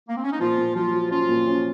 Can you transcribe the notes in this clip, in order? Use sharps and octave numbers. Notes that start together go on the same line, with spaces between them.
A#3
C4
C#4
D#4
A#2 F3 F4
A#2
F3 F#3 F4
F#3
F3 C#4 F4
A#2
C#4